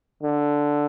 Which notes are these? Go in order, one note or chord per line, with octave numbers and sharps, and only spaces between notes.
D3